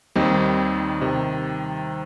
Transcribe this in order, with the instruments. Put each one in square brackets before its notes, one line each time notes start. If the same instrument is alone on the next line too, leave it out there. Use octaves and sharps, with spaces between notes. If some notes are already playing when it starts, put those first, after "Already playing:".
[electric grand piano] D#2 D#3 G3 C4 D#4
C3 D#3